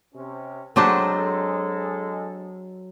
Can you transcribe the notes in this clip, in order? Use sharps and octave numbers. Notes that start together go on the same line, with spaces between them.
C3 C#4
F#3 G#3 C4 D4 G4 A4 C5 F#5